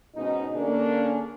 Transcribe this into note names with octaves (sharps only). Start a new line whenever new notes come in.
G#2 B2 C#4 D#4
D3 A#3 C#4 D4 G#4 A#4